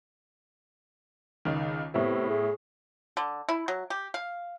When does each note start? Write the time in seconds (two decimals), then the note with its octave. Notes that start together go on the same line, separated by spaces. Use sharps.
1.45 C#2 D#3
1.94 A2 C3 B3 E4
2.30 G#4
3.17 D3
3.49 E4
3.68 F#3
3.90 G4
4.14 F5